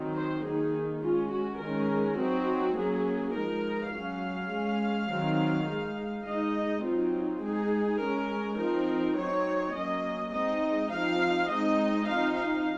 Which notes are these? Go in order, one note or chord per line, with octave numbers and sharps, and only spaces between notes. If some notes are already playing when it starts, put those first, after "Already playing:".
Already playing: D#3 F#3 C4 D#4
C5
D#3 A#3 D#4 G#4
G#3 C#4 F4
F#4
D#3 G#3 C#4 A#4
F#3 C4 D#4 F#4
F#3 A#3 C#4 G#4
F3 G#3 D#4 A#4
F#3 C#4 F5
G#3 C#4
D#3 F#3 C4
G#3 D#4
G#3 D#4 D#5
F#3 C4 D#4 F4
G#3 D#4 G#4
G#3 C#4 A#4
F3 C4 D#4 A#4
F#3 C4 D#4 C#5
F#3 A#3 C#4 D#5
G#3 C4 D#4 D#5
F3 C4 D#4 F5
G#3 C4 D#4 D#5
F3 C4 D#4 F5
F5